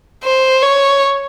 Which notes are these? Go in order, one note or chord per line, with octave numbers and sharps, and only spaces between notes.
C5
C#5